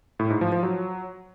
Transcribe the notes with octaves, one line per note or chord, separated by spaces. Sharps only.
A2
G#2
F3
F3
F#3